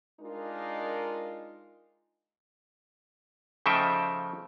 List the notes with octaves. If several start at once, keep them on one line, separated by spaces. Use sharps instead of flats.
G#3 D4 D#4 F4 A#4
C#3 F3 A3 D#4 E5 G5